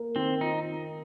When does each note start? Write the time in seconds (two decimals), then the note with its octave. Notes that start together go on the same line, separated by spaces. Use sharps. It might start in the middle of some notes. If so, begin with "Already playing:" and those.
Already playing: A#3
0.16 D#3 C4
0.41 D#4 F4